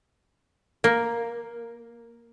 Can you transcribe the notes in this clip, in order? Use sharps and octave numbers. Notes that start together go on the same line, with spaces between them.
A#3